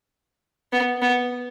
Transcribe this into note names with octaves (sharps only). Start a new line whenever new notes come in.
B3
B3